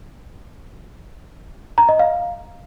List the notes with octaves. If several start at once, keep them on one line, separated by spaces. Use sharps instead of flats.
A#5
D#5
F5